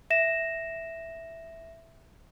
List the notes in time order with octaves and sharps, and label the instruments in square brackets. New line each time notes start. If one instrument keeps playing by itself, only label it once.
[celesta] E5 A#6 E7